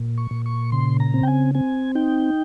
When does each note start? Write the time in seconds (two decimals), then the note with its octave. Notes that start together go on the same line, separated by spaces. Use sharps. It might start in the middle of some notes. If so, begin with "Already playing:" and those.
Already playing: A#2
0.18 C#6
0.31 A#2
0.46 C#6
0.72 C#3 C6
1.00 A#5
1.14 C4
1.23 G5
1.27 G#5
1.55 C4 G#5
1.95 D#4 G5